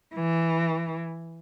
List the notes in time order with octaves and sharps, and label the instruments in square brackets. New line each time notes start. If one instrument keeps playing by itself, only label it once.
[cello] E3